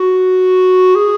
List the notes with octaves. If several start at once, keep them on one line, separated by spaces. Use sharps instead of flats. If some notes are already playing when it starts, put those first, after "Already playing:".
Already playing: F#4
G#4